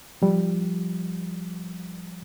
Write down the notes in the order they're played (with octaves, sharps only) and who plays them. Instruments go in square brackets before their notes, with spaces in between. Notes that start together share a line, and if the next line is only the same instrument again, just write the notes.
[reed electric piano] F3 G3